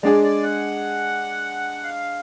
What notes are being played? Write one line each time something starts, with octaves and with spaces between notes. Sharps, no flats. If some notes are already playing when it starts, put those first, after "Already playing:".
G#3 D4 G#4 D5
D5
F#5
F5